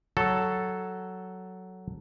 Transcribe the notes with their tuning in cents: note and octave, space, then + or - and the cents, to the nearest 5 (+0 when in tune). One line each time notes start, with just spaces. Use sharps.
F#3 +5 A4 +0